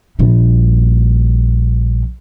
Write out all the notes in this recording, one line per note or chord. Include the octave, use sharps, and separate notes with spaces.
A#1 G3